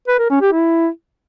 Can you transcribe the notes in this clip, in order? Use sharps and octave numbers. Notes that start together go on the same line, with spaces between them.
B4
A#4
C#4
G4
E4